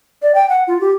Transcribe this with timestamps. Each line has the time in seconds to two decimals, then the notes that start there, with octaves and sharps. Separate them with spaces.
0.22 D5
0.35 G5
0.49 F#5
0.67 F4
0.80 G4